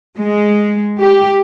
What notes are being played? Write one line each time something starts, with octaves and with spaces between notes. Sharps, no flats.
G#3
G4